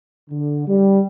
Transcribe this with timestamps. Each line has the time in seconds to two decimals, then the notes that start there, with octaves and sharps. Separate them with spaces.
0.30 D3
0.67 G3